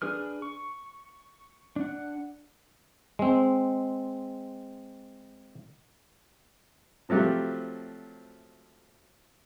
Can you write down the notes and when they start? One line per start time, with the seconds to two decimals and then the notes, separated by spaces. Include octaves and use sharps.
0.02 D4 G#4 B4 F6
0.42 C#6
1.76 D4 F#5
3.19 G#3 C4
7.09 C3 F3 F#3 A3 G4